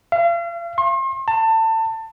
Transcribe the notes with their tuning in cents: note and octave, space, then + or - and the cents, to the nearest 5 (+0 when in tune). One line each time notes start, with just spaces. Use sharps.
F5 -40
C6 +40
A5 +25